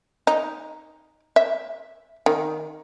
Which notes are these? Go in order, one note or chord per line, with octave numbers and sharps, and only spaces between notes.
D#4
E5
D#3